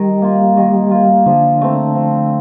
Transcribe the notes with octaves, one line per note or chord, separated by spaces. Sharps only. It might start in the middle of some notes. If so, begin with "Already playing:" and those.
Already playing: D#3 G3
A#3 F4
D#3
A#3 F4
D3 F3
A3 C4
F3